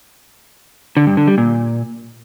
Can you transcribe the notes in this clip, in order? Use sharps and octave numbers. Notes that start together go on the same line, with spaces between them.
D3
G2
D3
G3
A#2